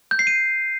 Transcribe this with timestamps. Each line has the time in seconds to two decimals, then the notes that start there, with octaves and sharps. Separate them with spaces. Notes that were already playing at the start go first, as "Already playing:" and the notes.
0.11 G6
0.19 C7
0.27 D#7